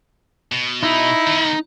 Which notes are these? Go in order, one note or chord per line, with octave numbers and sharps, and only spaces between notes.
B2
D#4 E4
D#3 B3